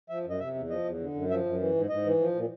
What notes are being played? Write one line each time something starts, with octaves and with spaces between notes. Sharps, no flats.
F3 E5
F#2
D#5
C3 E5
E2
F3 D#5
E2
D3
F#2
F3 E5
F#2
E3
G#2
G#2 D#5
E3
F3
A#2